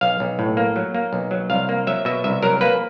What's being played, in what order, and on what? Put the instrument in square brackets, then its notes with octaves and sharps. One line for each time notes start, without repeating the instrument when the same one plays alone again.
[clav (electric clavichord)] B1 F5
B1
A2
A#3
F#3
A#3
B1
F#3
C2 F5
A#3
F#3 E5
B2 E5
C2 E5
F#3 A#4
A#3 B4